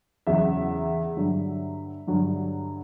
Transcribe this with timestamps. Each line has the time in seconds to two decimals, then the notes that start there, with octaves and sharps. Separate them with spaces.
0.27 E2 C#3 F#3 E5
1.16 G2 D3 F#3
2.07 G2 D3 F#3